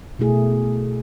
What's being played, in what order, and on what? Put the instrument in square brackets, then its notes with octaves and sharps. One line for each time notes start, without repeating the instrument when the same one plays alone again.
[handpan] B2 A3 E4 G#4